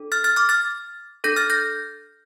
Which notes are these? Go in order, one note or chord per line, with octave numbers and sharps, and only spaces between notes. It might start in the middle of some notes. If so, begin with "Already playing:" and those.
Already playing: D4 A4
F6 A6
F6 A6
D6 F6
F6 A6
D4 A4 G6 A#6
F6 A6
G6 A#6